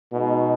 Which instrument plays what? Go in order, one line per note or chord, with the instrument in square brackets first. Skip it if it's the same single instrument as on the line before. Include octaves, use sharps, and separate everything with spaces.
[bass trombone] B2 [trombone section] G#3 D#4 F#4